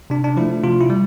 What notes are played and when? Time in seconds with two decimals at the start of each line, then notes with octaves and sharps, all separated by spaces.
0.10 C3 D4
0.24 D4
0.37 F3 A3 E4
0.63 C3 F4
0.81 E4
0.90 G3